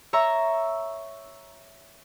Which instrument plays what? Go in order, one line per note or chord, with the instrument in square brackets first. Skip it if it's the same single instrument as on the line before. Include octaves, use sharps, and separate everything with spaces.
[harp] C#5 E5 A#5 C#6 E6